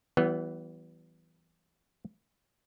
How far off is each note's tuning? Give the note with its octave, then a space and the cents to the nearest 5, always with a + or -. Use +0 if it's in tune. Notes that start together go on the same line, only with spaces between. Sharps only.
E3 +0 G3 -45 B3 +0